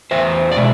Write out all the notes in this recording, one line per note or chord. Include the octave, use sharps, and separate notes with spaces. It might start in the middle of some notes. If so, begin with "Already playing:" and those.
E2 C5 E5
D5
B2 G#3 E5